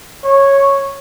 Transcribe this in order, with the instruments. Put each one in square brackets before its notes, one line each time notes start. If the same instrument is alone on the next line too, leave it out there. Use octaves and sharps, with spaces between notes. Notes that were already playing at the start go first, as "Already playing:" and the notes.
[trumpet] C#5